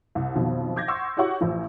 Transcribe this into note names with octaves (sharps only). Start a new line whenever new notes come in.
C2
B1 F2 B2 D#3
D6 G6 G#6 A#6
F#5 C6 C#6 E6
E4 F#4 G4 C#5 F#5 C#6
A1 F3